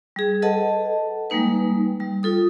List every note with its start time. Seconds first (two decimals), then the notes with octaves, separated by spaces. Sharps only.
0.16 G3 G#4
0.42 A4 B4 D#5 F#5 A5
1.30 G3 G#3 A#3 D#4 B4
2.00 G3
2.23 F4 A4 D#6